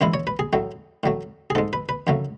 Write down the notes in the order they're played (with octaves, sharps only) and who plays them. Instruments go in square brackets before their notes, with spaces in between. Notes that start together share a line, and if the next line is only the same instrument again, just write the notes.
[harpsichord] F#2 E3 G#3 E4
C#5
B4
G#4
A2 F#3 A3
A2 F#3 A3
G#4
G#2 G#3 A4
B4
B4
F#2 C#3 F#3 A3